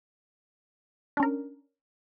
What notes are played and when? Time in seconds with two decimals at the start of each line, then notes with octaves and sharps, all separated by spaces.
1.17 D4
1.20 C#4
1.23 A#4